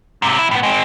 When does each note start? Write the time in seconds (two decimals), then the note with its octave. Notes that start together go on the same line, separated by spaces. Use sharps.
0.22 G#2 C3
0.39 E2 E4
0.51 A2 B3
0.63 G#3 C4